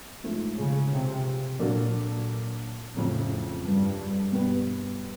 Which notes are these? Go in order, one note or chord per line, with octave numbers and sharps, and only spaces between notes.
G#2 F3 A3
C#3
C3
A#2 F#3 A#3 D4 F#4 A4
F2 A2 C#3 F#3
G2
B2 G3 B3